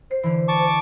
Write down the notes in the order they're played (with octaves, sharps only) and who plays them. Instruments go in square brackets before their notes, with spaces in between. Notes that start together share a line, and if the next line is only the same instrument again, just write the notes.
[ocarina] C5 [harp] C7
[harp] D3 E3
[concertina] A5 C#6 D6
[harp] D7